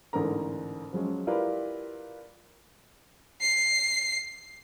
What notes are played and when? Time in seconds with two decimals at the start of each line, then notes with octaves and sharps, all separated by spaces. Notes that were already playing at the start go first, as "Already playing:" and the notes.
0.13 A1 G#2 D3 A#4 A#5
0.93 F3 F#3 G#3 C#4
1.27 E4 F4 G4 A#4 B4 D5
3.41 C7